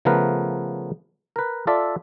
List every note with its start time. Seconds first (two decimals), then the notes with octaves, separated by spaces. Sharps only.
0.05 C#3 F3 A3 B3 A#4 B4
1.36 A#4 B4
1.67 F4 A4 D5 E5